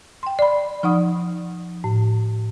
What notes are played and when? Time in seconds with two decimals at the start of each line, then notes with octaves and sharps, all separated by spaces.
0.23 G5 C6
0.39 D5 B5
0.83 F3 D#4 F#5 D#6
1.84 A2